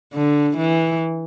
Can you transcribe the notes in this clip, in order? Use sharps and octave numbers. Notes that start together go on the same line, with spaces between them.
D3
E3